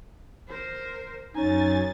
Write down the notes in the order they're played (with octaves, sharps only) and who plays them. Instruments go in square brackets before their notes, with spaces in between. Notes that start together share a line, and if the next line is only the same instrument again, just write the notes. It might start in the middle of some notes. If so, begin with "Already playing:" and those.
[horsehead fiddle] A#4 C5
[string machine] F#2 A6 [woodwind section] C#4 D#4 [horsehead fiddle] G#5